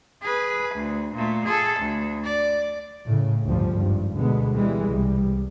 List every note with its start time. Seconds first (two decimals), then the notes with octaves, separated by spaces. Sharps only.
0.23 G#4 B4
0.75 D2
1.16 A#2 A3
1.46 G#4 A4
1.80 D2
2.24 D5
3.06 A2 C#3
3.46 G1 D2 F3 G3
3.75 G#1 G2
4.16 D2 B2 G#3 B3
4.54 E3 G3 G#3
4.87 C2 G3